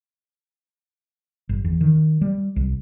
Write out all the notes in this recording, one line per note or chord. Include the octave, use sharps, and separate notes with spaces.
G1
E2
D#3
G3
C2